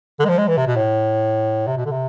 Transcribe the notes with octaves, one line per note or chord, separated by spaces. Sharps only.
D3
G#3
F3
G#3
E3
C3
B2
A2
C3
B2
D3
C3